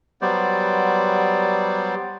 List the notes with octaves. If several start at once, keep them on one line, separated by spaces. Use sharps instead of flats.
F#3 G3 B3 C5 D5